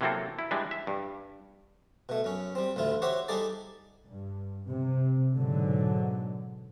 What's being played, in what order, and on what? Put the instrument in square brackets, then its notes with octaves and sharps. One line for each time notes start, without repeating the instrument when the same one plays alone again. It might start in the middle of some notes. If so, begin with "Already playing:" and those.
[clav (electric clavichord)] C3 E3 F#3 A#3 C4 A4
E4
E3 G3 G#3 D4
E5
G2
[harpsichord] B2 A3
F#2 C#4
G3 C4
A1 D2 E4 F4
F#4 G4 C5 C#5 E5
G3 D#4 G#4 A4 D5
[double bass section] G2
C3
G#2 B2 D3 F#3